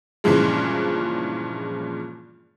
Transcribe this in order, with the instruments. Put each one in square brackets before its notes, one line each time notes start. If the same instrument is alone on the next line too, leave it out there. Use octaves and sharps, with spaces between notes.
[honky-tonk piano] G2 A#2 C#3 E3 F3 G#3